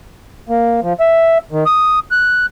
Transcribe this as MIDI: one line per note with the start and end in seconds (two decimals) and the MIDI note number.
0.49 0.80 58
0.82 0.93 53
1.00 1.38 76
1.52 1.64 51
1.66 1.99 87
2.11 2.46 90